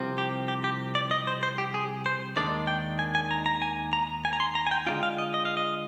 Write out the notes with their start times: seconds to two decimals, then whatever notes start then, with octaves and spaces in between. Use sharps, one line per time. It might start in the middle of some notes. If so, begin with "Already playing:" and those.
Already playing: C2 C3 F3 C4
0.18 G4
0.48 G4
0.64 G4
0.95 D5
1.11 D#5
1.27 C5
1.43 C5
1.58 G4
1.74 G#4
2.06 C5
2.36 D#2 D#3 G#3 D4 D5
2.67 G5
2.99 G#5
3.15 G#5
3.31 A#5
3.46 A#5
3.62 G#5
3.93 A#5
4.25 G#5
4.33 A#5
4.40 C6
4.55 A#5
4.67 G#5
4.71 G5
4.87 D3 G#3 D4 F4 G5
5.03 F5
5.18 D#5
5.34 D#5
5.45 F5
5.57 D#5